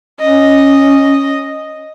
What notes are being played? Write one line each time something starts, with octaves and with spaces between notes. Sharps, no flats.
C#4 D#5